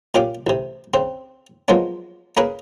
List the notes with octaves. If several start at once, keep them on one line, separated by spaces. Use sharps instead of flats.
A#2 C#4 G4 F5 D6
A1 C3
C#3 C4
B2 F3 F#3 G#3 A#3 C#4
A#3 C#4 G#4 A#4 B4